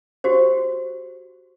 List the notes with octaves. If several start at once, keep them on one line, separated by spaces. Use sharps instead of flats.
F#4 G4 C5